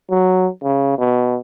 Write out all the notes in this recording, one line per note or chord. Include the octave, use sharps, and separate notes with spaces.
F#3
C#3
B2